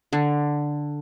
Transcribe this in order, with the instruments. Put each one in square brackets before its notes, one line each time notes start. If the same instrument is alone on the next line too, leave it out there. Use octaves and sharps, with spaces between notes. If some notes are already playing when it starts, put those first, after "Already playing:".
[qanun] D3